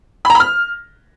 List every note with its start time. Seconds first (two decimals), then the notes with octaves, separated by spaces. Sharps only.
0.25 B5
0.30 A#5
0.35 B5
0.40 F6